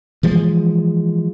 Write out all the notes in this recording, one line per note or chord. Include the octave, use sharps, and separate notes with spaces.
E3 F3 G#3